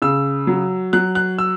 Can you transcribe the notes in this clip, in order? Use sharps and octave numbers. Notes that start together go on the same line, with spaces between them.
C#3 E6
F#3
F#3 F#6
F#6
E6